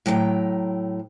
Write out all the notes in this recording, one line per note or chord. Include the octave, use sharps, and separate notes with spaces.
A2 F#3 G5 A5 A#5